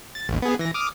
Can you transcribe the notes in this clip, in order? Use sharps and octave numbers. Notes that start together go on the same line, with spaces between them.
A6
A1 D#2
B3 G#4
E3 A#6
D6 D#6 F6